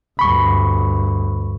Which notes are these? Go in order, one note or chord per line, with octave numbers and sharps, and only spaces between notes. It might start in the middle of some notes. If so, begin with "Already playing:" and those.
D2 G2 B5 C#6